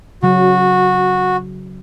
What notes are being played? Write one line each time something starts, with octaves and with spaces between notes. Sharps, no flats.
C#3 F#3 F#4